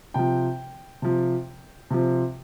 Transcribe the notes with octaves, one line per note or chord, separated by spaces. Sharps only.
C3 F3 G5
C3 F3
C3 F3